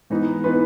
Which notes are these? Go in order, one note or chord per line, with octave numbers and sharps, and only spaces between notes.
G#2 E3 B3 D#4
E3 B3 D#4 B4